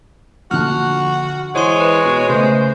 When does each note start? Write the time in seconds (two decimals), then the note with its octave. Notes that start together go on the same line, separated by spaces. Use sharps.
0.51 A#1 D3 F#4 A5 F6 F#6
1.55 E3 G#3 C5 C#5 C6 D#7
1.81 B4 D#5
2.06 B2
2.29 C#3 A3 A4 C5